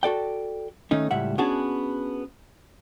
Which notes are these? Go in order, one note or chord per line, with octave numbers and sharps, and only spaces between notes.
F#4 A4 D5 G5
D#3 A3 C#4 D#4
C#2 A2 G3 E5 F#5
B3 C#4 D4 F#4 G#4 A5